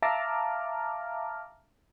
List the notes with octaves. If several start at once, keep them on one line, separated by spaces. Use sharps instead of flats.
E5 F5 A5 A#5 D6 F6